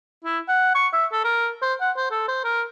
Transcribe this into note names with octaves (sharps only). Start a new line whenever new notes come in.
E4
F#5
C#6
E5
A4
A#4
C5
F#5
C5
A4
C5
A#4